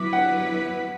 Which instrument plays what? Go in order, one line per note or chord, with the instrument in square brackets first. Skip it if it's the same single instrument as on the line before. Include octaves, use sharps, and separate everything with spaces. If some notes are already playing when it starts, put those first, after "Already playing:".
Already playing: [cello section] F#3 B3 E4 B4 [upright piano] D6
[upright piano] F#5